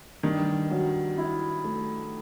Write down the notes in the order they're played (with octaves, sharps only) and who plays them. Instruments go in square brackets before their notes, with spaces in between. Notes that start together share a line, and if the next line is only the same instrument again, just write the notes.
[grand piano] G2 [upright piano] D#3
[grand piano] F#3
E4
A3